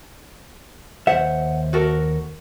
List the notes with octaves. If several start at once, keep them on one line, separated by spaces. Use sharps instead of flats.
D#2 C5 E5 F#5
F#4 A4 A#4